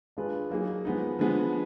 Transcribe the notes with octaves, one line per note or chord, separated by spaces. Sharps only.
G#3 D4 F4 G#4 B4
F#3 A#3 D#4 G#4
F3 G#3 B3 D#4
D3 F3 G#3 B3